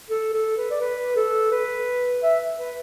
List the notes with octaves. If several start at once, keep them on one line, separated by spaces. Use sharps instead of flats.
A4
A4
B4
D5
B4
A4
B4
E5
B4